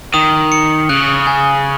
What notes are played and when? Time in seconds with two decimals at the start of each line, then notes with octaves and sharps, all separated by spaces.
0.14 D#3 D#6
0.52 C#7
0.89 C#3 F#6
1.27 G#5